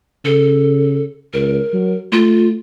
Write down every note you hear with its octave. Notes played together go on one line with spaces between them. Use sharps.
C#3 A4
C#2 A#4
F#3
A3 F4